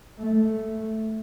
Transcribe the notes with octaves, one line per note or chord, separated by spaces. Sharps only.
A3